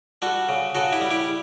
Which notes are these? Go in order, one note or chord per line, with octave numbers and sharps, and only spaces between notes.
G3 F#4 A4
C#3
C#3 F#4 A4
E4 G4
G3
E4 G4